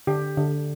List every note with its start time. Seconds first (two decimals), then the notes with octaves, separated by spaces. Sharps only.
0.07 D3 G4
0.37 D3